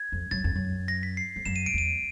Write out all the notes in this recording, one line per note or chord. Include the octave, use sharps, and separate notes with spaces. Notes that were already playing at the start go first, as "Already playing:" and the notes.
Already playing: G#6
F2
F#2 A6
F2
F#2
A#6
B6
C7
F2
F#2 E7
D#7
D7
E2 D#7